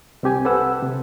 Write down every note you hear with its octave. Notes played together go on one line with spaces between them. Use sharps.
C2 C4 G4 G#5
A4 B4 C5 F#5 E6
C3